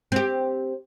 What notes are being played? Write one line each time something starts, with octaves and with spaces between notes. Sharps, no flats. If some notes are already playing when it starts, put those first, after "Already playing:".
C4 G4